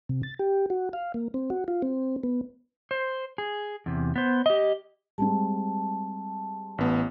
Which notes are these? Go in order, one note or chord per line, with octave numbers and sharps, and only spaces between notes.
C3
A6
G4
F#4
F5
A#3
C4
F#4
F4
C4
B3
C5
G#4
E2 C3
B3 C5
G4 D#5
G3 G#3 C4 A5
A1 B3